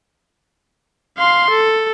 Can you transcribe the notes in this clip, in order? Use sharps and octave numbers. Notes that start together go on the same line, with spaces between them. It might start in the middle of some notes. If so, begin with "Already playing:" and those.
F5 C6
A4